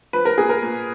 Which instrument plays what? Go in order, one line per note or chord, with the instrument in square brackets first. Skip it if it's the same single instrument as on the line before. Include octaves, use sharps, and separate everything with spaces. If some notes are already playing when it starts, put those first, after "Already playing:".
[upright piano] F3 B4
A#4
A#2 G#4
A#4
A#2